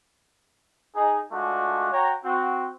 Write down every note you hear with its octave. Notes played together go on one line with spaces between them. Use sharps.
D#4 G#4
G#3 A3 D4 F4 F#4
F#4 C#5 G5 A#5
C4 F#4